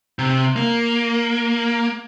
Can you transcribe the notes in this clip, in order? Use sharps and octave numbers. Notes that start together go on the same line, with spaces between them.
C3
A#3